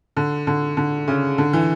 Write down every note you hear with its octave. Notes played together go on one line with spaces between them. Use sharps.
D3
D3
D3
C#3
D3
E3